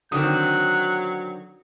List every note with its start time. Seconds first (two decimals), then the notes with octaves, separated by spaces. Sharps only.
0.12 D3 D#3 F#3 C4 D#6 F#6